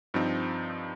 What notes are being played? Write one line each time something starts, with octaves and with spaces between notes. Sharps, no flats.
G2 F3 C4 D#4